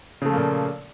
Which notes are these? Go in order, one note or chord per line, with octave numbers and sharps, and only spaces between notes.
A#2 C#3 F3 A3 A#3